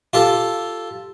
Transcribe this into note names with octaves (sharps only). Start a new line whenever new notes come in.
F4 G4 A4